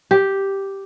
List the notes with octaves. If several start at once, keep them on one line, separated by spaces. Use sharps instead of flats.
G4